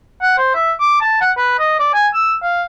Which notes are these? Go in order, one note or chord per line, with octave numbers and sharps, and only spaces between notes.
F#5
C5
E5
D6
A5
F#5
B4
D#5
D5
G#5
E6
F5